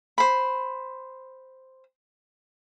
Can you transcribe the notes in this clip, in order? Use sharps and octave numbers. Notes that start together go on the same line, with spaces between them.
C5 B5